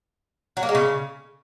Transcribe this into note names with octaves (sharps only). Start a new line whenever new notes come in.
F#3
A#3
G#3
C#3